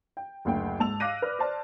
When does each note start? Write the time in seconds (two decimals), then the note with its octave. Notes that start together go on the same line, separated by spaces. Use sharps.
0.17 G5
0.45 F#1 D2 G5
0.80 G#2 A5 E6 F7
1.00 F5 D6 F#6 A#6 D#7
1.22 B4 D5 F6
1.39 C5 D5 A5